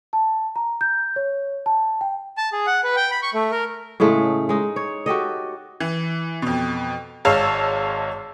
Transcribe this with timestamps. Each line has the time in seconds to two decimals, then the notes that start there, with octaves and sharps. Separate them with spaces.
0.13 A5
0.56 A#5
0.81 G6
1.16 C#5
1.66 A5
2.01 G5
2.37 A5
2.52 G#4
2.67 F#5
2.84 B4
2.96 G5
3.11 B5
3.22 C#6
3.34 A3
3.51 A#4
4.00 A2 C#3 G#3 A3
4.49 G#3 D#4
4.76 C#5
5.06 F#4 G4 A4 D#5
5.80 E3
6.42 F2 B2
7.25 G#1 G#3 C#5 F5 A5 E6